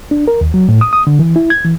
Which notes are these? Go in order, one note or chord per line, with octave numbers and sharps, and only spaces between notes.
D4
A#4
D#2
F#3
A2
D#6
D#6
D3
E3
E4
G#6
E3